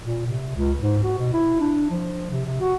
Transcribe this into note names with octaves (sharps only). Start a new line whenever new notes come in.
A#2
C3
C#2
G#2
F#4
B2
E4
D4
F3
C3
C3
F#4